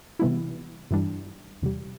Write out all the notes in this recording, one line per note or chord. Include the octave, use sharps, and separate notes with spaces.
C3 E3 G3 B3 E4
G2 E3 G3 D4
E2 C3 G3